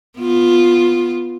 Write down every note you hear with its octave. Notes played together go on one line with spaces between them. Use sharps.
B3 F4